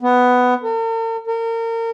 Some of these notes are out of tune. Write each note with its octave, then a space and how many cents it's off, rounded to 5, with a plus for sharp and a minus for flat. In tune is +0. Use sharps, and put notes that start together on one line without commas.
B3 +10
A#4 -45
A#4 -30